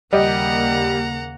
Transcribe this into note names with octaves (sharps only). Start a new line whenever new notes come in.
D#2 C#3 G3 A#3 G4 D#5 F#5 A#5